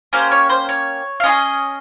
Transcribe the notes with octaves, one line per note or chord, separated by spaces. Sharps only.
A#3 C#4 G4 C5
C#5
C5
C#5
F5
C#4 F4 D#5
G#4